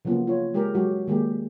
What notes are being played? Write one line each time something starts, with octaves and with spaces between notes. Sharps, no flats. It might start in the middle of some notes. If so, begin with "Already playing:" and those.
C#3 F3 F#3 A#3 B3 F4
F4 C#5
G#3 G4 G#4 A#4
F#3 G#3 F#4 G4
D#3 G#3 A#3 G4